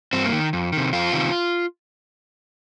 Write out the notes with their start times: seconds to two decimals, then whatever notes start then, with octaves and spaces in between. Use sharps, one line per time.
0.13 G2 C4
0.25 A#3
0.32 D#3
0.53 F2
0.72 C3 D#3
0.93 F2 F4
1.13 C3 D#3